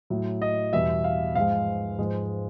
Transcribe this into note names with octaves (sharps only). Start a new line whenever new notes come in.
A2 F#3
D#5
E2 B2 G3 E5
F5
G#2 F3 G#3 F5
G#2 F3 G#3